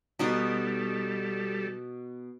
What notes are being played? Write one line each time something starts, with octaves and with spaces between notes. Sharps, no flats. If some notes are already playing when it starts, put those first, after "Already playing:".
B2 G3 D#4 F#4 A4